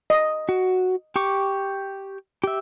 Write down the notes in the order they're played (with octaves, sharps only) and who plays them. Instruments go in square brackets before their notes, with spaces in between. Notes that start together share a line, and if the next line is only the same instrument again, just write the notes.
[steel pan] D#5
[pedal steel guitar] F#4
G4 C#6 D6
G4 E5